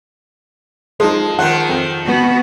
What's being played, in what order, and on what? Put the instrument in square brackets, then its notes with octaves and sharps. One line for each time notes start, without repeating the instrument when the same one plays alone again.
[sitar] F3 [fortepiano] G#3 D#4
[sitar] D#3 F3 [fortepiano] F#5
[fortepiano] F2
[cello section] B3 F#4